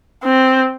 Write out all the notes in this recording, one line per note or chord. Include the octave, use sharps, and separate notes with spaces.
C4